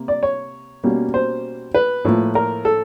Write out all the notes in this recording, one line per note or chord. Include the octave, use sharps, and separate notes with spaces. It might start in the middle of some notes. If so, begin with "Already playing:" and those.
Already playing: C3 A#3
D5
C#5
B2 G3 A#3 C#4
C5
B4
A2 F3 A#3
A#4
A4